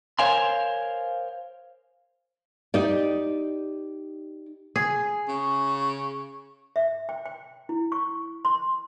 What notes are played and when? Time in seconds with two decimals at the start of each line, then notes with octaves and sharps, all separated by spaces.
0.19 A#4 C5 C#5 F5 G#5 C6
2.74 D#4 G4 D5
4.76 G#4
5.28 C#3 C#6
6.76 E5
7.09 G5
7.26 G5
7.69 E4
7.92 C#6
8.45 C6